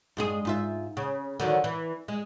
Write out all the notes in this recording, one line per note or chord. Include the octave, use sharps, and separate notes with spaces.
G2 G#3 G#4
G#2 F4 E5
C#3
D3 D#3 F#3
E3
G#3